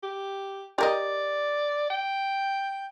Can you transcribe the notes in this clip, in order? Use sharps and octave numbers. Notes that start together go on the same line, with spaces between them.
G4
G4 A#4 D5 D#5
G5